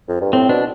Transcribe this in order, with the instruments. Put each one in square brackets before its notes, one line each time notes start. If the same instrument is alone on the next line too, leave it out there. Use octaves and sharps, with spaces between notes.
[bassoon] F2
G2
[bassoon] A2 [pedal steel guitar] C4
[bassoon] B2 [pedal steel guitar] D4